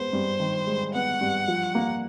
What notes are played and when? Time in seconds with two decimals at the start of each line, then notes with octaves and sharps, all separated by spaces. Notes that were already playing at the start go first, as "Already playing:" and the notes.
Already playing: G#3 B3 C5
0.13 G2
0.40 D#3
0.67 G#3
0.94 B3 F#5
1.21 G2
1.48 F3
1.75 A#3